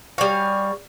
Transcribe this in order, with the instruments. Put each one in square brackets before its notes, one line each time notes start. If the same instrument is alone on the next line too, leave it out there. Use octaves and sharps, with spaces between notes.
[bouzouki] G3 F5 [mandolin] F#4 C#5 G#5